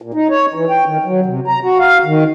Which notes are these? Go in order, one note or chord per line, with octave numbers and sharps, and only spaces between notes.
A#2
D#4
C#5
E3
G5
D#3
F#3
C3
A#5
F#4
F5
D#3